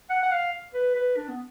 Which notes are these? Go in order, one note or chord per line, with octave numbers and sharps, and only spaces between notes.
F#5
F#5
F5
B4
B4
D4
B3